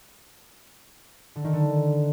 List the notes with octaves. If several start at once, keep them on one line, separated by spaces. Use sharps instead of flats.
D3
D#3
D3